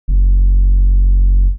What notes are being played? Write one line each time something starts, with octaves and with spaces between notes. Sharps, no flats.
F#1